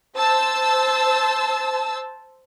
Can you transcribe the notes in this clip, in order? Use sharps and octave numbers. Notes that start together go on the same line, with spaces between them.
C5 A5 E6